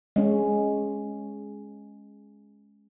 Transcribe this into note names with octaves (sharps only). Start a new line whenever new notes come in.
G#3 C#4